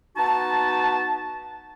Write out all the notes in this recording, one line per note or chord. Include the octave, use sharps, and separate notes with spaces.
B3 D#4 F#4 A5